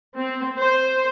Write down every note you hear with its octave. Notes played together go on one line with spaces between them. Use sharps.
C4
C5